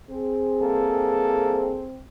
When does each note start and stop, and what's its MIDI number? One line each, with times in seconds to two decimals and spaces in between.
0.10 2.01 60
0.10 1.84 68
0.61 1.83 36
0.61 1.83 58
0.61 1.83 69